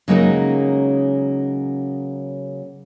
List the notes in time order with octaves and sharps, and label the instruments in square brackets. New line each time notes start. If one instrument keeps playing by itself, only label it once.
[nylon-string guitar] C#3 F#3 G#3 A#3 C#4 D#4